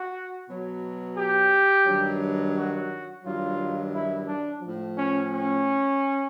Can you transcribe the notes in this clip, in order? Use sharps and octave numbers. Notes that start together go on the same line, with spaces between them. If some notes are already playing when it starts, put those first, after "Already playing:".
Already playing: F#4
B2 F#3
G4
G2 D#3 F#3
F#4
G2 D#3 F#3 F4
E4
D4
A2 F3
C#4
C#4